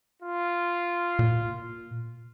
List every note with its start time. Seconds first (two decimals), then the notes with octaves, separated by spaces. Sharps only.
0.22 F4
1.19 A#2